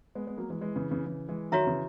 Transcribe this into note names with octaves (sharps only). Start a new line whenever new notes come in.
G#3 B3
G#3 B3
F#3 A#3
E3 G#3
E3 G#3
C#3 E3
C#3 E3
C#3 E3
E3 G#3
D#3 F#3 F#4 C#5 E5 A#5
C#3 E3